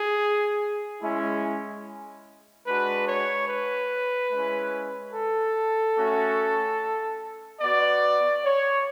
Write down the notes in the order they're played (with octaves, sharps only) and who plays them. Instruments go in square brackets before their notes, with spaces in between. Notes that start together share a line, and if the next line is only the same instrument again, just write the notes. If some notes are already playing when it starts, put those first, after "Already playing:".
Already playing: [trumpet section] G#4
G#3 C#4 E4
G#3 D4 F#4 B4
C#5
B4
G#3 C#4 E4
A4
A3 C#4 F#4
B3 F#4 D5
C#5